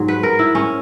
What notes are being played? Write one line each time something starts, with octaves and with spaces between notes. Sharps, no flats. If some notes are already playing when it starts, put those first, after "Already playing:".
Already playing: G#2 F#3
B4
A#4
E4
C#4